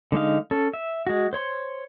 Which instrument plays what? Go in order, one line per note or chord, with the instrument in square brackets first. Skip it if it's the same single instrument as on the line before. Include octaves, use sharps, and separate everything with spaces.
[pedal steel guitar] D3 G#3 D#4 F5
C#4 A4
E5
G#3 F#4
C5 C#5 C6